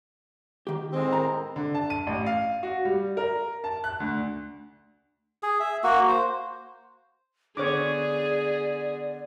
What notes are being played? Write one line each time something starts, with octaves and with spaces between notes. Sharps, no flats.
D#3 G4
A2 G#3 C4
A#4 A#5
D3
A5
D#7
A1
F5
F#4
G3
A#4
A5
F#6
D2
G#4
E5
A#3 F#4
C5
D3 B3 G#4 C#5 D5 D6